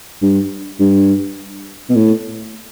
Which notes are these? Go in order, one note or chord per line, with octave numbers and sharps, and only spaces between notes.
G2
G2
B2
A2